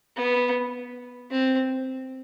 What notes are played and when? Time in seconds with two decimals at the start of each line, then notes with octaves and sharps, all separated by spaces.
0.17 B3
1.31 C4